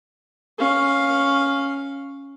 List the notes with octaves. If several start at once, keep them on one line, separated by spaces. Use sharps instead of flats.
C#4 F5